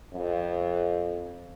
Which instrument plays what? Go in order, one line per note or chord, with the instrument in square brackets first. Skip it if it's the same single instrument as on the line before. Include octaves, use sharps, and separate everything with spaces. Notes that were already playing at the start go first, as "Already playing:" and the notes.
[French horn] F2